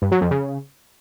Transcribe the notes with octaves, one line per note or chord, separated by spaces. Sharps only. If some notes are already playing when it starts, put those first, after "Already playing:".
G2
F#3
F2
C#3